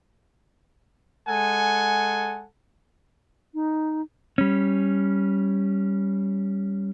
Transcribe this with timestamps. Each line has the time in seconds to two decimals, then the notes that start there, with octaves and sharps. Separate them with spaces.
1.27 G#3 A4 F#5 G#5
3.54 D#4
4.38 G3 C#4